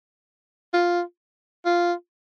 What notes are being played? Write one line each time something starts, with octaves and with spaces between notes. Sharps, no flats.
F4
F4